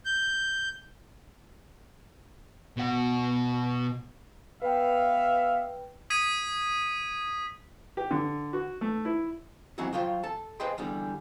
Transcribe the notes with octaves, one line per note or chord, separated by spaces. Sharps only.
G6
B2 F#5
B3 B4 E5 F5 G5
D#6 G#6 B6 D#7
G4
D3
F#4
A3
E4
E3 F#3 C4 D#4 E4 F#4
F3 F#3 F4 C5 G5
A4 A5
G#4 B4 C5 D#5 G5 C6
E2 D3 G3